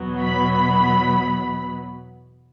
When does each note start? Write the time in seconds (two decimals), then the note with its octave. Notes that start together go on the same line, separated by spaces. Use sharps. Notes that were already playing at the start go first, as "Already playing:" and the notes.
Already playing: E2 B2 F#3 B3
0.21 B5